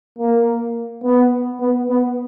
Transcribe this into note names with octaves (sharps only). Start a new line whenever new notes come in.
A#3
B3
B3
B3